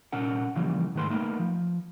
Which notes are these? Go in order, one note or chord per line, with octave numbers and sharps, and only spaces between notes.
C2 A#2 C#4 A#4 F#5
C#3 E3 F3 G3 A#3
G#2 D#3 A3 B4 C6
A3 A#3 D#4 A#4 B4
F3